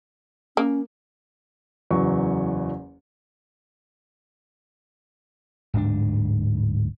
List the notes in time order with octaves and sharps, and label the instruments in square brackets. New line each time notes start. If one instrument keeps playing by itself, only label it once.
[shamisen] A#3 [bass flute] C#4
[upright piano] F#1 E2 F#3 C#6
[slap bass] D1 G#2 C4 D4